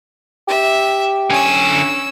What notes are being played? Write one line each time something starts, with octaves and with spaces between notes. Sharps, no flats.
G4 E5
D3 C#4 G#5 E6